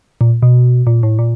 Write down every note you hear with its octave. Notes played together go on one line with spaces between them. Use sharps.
A#2
B2
A#2
A2
A#2